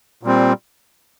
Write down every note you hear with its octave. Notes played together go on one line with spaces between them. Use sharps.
A#2 G3 C4